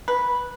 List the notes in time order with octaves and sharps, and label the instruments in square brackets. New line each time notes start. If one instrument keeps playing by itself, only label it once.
[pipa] B4